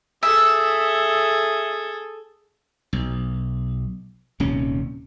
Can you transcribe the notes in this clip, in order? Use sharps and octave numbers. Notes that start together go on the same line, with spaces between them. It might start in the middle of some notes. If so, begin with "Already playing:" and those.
G#4 A4 E5
B1
D#1 D#2 C3 C#4